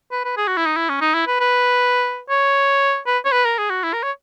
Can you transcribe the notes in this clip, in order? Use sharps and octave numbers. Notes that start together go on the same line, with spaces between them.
B4
B4
G#4
F#4
E4
D#4
E4
C#4
D#4
E4
B4
B4
C#5
B4
C#5
B4
A#4
G#4
F#4
E4
A#4
C#5